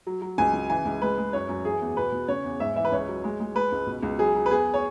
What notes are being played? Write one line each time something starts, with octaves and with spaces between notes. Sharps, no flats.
F#3
F#3
C#2 G#5
C#3
E3 G#5
C#2
G#3 B4
G#3
F#2 C#5
F#2
E3 G#4
E2
B2 B4
B2
C#3 C#5
E2
G#2 E5
E3 E5
B4
C#2 C#5
F#3
G#3
G#3
G#3 B4
C#2
B2
C#2
F#3 G#4
F#3
B4
E2 G#4
C#5